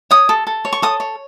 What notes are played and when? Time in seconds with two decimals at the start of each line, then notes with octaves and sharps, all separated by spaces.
0.11 C#5 D#6
0.29 A4
0.47 A4
0.65 C#5
0.73 C#6
0.82 A4 D#6
1.00 C#5